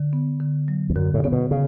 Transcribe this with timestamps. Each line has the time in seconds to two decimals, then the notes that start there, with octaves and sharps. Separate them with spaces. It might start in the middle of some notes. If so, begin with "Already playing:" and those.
Already playing: D3
0.13 B3
0.40 D3
0.68 F#3
0.90 E2
0.96 F#2 D3
1.14 A2
1.24 C#3 B3
1.32 B2
1.51 C#3